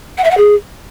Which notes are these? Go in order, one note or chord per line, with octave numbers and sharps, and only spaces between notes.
F#5
E5
F#5
G#4